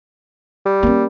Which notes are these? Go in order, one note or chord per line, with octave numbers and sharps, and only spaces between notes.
G3
A#3 C#4